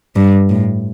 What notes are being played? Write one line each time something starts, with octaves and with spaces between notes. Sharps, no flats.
G2
A2